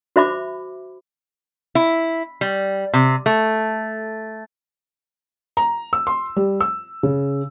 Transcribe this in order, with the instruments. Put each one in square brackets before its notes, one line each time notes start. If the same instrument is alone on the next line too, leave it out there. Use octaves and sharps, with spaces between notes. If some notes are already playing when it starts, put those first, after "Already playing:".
[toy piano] F#4 C5 E5 B5 D6
[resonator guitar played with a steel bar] E4
G3
C3
A3
[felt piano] A#5
E6
C6
G3
E6
C#3